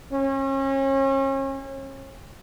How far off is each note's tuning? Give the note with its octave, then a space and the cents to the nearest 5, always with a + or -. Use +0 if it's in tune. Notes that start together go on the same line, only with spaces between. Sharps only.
C#4 -35